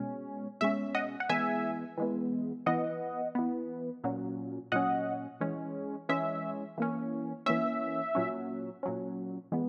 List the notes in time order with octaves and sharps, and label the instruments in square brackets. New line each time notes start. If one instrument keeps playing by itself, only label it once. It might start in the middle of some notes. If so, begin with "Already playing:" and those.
Already playing: [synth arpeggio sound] B2 G#3 C#4
B2 G#3 C#4 E5
D#5 F#5
F#5
E3 G#3 B3 E5 G#5
E3 G#3 B3
E3 B3 D#5 F#5
E3 B3
A#2 F#3 C#4
A#2 F#3 C#4 D#5 F#5
E3 G#3 C#4
E3 G#3 C#4 E5
E3 A#3 C#4
E3 A#3 C#4 E5
A#2 F#3 C#4
A#2 F#3 C#4
E3 G#3 B3